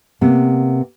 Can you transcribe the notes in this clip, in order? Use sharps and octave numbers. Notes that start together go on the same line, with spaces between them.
C3 A#3 B3